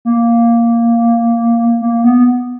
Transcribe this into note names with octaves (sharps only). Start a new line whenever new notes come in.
A#3
A#3
B3